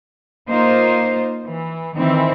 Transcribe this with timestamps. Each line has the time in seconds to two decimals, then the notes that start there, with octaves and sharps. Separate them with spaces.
0.50 A#3 D#4 F4 C5
1.45 E3
1.95 D#3 E3 C4 E4